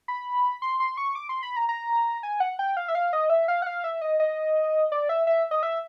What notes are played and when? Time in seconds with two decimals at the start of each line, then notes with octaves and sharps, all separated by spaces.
0.08 B5
0.62 C6
0.80 C6
0.97 C#6
1.15 D6
1.29 C6
1.43 B5
1.56 A#5
1.69 A#5
2.23 G#5
2.40 F#5
2.59 G5
2.77 F5
2.88 E5
2.95 F5
3.13 D#5
3.30 E5
3.48 F5
3.62 F#5
3.66 F5
3.84 E5
4.01 D#5
4.20 D#5
4.92 D5
5.09 E5
5.27 E5
5.51 D#5
5.63 E5